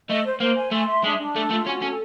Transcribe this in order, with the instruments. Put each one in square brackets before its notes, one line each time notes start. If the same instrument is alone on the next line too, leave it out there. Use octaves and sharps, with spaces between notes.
[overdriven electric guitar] A3 [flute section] D#5
[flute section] C5
[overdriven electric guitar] A#3 [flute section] C5
[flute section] G#5
[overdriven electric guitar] A3 [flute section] C6
[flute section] E5
[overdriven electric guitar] G#3 [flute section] D4
[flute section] D4
[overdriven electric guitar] A3 [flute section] A4
[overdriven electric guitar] A3 [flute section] F4
[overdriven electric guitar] C#4 [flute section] F#4
[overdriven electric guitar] C#4 [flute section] A4